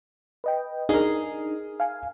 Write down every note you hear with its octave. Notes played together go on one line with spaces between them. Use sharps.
B4 D#5 G5
D4 D#4 G#4 A#4
F5 G#5